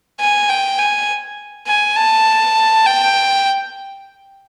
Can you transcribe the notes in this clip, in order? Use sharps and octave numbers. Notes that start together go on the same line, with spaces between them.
G#5
G5
G#5
G#5
A5
G5